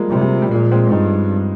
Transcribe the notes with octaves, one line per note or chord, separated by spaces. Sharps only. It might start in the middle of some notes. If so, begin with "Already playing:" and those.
Already playing: F3 G3 G#3 A#3
C3 G3
G3
F3
G3
A#2 F3 G#3
G#3 C4
G2 C4 D#4